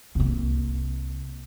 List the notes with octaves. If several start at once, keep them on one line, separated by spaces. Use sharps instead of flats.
C2 A#3